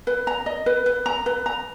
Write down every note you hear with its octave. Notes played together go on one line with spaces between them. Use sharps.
B4
A#5
D#5
B4
B4
A#5
B4
A#5